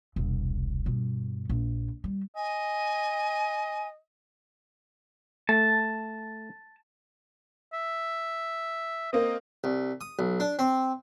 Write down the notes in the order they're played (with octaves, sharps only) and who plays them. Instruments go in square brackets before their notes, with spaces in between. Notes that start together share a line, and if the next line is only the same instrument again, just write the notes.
[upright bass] E1 C2
G2 B2
A#1
G3
[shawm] D#5 [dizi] G#5
[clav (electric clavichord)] A3 [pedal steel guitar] A5
[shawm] E5
[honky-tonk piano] A#3 C4 [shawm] D#5
[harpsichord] C2
D#6
B1
D4
C4